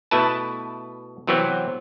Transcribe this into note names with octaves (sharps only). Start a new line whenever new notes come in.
B2 A3 E4 B4 A5
C3 E3 F#3 B3 C4